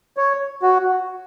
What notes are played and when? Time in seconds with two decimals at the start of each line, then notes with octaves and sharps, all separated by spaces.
0.17 C#5
0.62 F#4